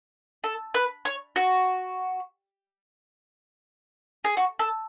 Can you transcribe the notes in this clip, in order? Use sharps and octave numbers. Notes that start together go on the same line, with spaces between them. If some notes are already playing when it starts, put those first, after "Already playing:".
A4
B4
C#5
F#4
G#4
F#4
A4